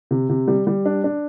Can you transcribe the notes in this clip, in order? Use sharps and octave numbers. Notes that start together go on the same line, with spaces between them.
C3
C3
G3
G3
D4
D4